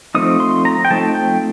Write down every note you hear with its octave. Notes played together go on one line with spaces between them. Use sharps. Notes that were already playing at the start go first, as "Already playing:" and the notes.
F3 A3 C4 D#4 D#6
C6
A#5
G5
F3 A3 C4 D#4 A5
G5